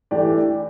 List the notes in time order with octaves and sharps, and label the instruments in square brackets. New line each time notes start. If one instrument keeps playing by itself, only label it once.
[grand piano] E3 A3 D4 G4 D5